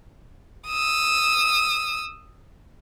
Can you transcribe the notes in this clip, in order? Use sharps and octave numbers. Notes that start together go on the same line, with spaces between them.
D#6 E6